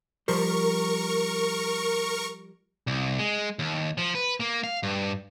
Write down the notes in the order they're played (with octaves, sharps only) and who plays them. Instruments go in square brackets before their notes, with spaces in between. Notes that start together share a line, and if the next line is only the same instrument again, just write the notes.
[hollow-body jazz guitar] F3 G3 C5 [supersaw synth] A#4 C#6
[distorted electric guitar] C2
G#3
D#2
F3
B4
A#3
F5
G2